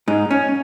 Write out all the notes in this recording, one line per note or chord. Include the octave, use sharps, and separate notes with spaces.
G#2 D#4
C#4